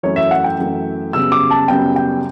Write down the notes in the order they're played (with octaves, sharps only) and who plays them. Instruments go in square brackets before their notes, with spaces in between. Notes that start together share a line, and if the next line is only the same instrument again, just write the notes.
[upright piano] F#2 E3 A3 C#5
E5
F#5
G5
F#2 E3 A3
F#2 C#3 G3 B3 E6
D6
A5
F#2 C#3 G3 B3 G5
G5